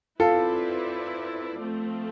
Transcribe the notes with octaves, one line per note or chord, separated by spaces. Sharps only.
C4 E4 F4 A4 B4 D5
F3 A3 C4